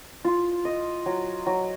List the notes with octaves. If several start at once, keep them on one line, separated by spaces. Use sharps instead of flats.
F4
D#5
F#3
F#3